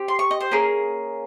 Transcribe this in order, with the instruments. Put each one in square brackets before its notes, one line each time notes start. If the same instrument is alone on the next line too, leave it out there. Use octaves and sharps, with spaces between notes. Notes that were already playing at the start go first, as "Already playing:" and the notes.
Already playing: [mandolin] C4 G4
C6
C#6
D#5
C5
A#3 C#4 G#4 A#4